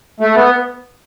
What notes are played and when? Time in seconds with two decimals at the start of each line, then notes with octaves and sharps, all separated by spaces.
0.20 A3
0.35 B3